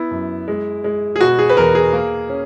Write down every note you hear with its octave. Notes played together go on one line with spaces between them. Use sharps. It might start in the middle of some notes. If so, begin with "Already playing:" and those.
Already playing: B3 E4
F#2
G#3
G#3
G#4
B2 F#4
G#4
B4
E2 A#4
G#4
A#3
C#4